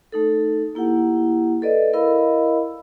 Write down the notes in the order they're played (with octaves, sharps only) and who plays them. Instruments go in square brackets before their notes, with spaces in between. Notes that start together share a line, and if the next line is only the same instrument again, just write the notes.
[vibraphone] A3 D#4 A4
A#3 E4 G4 F#5
A4 B4 D5 D#5
E4 A#4 D#5 F5 B5 E6